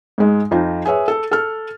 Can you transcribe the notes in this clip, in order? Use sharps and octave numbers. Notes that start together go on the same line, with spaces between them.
G#2 G#3
F2 F3 D#4 F4
G#4 B4 C#5 E5
A4
A4 F6